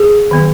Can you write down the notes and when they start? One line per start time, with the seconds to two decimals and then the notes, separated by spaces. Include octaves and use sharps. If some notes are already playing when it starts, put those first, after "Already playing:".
Already playing: G#4
0.31 D#3 F#3 B3